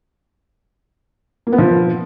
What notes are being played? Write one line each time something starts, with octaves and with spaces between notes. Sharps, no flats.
A#3
B3
F3